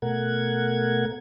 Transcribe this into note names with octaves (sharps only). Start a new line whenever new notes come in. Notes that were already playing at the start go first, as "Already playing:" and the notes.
B2 A3 A#4 F#5 G#6